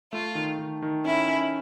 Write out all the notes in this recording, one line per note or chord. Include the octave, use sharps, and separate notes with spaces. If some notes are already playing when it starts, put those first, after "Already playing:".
A3 F4
D#3
D#3
D#3
C#4 E4
C#4